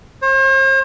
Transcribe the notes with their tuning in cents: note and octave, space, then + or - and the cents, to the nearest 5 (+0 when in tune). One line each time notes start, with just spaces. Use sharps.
C5 +45